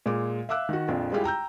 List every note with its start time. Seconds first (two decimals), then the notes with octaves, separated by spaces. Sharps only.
0.06 A#2 G#3 D6
0.49 E5 F5 D6 E6 F#6
0.69 D#3 F#4
0.88 A#1 F2 F4
1.12 G3 G#3 E4 F4 G4 G#4
1.24 G5 A#5 E6 G6